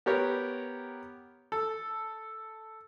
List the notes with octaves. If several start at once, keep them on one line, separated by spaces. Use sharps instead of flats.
B3 G4 A#4 C#5
A4